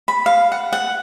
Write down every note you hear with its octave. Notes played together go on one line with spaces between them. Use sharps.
B5
F5
F#5
F#5